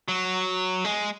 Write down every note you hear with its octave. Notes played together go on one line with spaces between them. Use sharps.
F#3
G#3